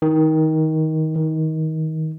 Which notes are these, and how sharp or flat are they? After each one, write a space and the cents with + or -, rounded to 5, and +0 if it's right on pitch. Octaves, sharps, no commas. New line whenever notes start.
D#3 +20
D#3 +25